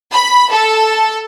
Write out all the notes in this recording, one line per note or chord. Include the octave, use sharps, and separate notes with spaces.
B5
A4